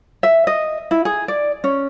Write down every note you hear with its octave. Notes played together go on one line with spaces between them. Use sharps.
E5
D#5
E4
G#4
D5
C#4